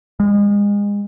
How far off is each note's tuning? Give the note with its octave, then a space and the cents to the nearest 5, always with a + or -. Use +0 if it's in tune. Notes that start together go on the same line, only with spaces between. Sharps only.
G#3 -30